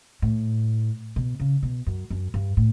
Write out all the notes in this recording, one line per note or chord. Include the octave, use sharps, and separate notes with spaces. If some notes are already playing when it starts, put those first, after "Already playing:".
A2
B2
C#3
B2
F#2
F#2
G2
A2